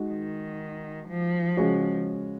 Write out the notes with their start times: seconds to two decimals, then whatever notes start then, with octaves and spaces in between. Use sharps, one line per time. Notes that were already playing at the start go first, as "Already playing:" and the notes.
Already playing: G#3 D#4 F#4
0.10 D#3
1.08 F3
1.57 C#3 G#3 C#4 F#4